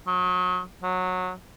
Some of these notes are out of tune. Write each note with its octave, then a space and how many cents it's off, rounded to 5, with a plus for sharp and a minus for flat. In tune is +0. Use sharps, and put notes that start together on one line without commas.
F#3 -30
F#3 -15